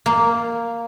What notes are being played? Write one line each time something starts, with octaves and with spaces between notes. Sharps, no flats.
A#3